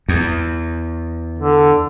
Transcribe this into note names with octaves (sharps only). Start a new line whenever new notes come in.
E2
D3